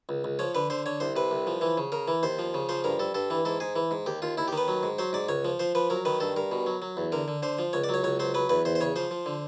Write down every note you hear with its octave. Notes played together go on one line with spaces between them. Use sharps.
C#2
C#2
F3 C#5
D3 B4
D3 C5
D3 C#5
C2 C5
C3 B4
C2
F3
E3
C#3
C#3 A#4
E3
D#2 C5
F3
C#3
F3 C5
G2 A#4
G2 A4
G2 A4
E3
G#2 A4
G#2 G#4
E3
G#2
D#2 G4
D#2 F4
D#2 E4
G4
D#3
B4
F#3
G#2
F#3 C5
G#2 D5
C#2 C#5
F3
F3 C5
F3 B4
F#3 A#4
D#3 B4
G2 A4
G2 A#4
B2
F#3
F#3
E2
D3 A#4
D3
D3 C5
F3
C#2 C#5
D5
F#3 C#5
C#2 C#5
F#3 C5
F#3 B4
E2 B4
E2 C5
C5
C#3 C#5
F3 C5
F3
D3